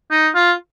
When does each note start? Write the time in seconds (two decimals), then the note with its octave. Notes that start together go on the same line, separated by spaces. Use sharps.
0.11 D#4
0.35 F4